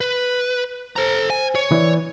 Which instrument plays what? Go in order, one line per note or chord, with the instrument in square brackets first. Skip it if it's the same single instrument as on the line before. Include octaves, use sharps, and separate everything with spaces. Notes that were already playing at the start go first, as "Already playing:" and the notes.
[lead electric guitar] B4
[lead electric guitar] A4 A#5 [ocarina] C5
[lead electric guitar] G#5
C#5
[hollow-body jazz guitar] E3 [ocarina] D5